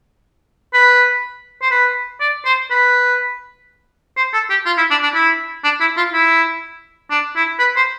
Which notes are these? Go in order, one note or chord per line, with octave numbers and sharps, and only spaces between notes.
B4
C5
B4
D5
C5
B4
C5
A4
G4
F4
E4
D4
D4
E4
D4
E4
F4
E4
D4
E4
B4
C5